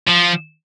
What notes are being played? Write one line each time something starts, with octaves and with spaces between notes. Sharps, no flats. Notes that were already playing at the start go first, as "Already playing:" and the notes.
F3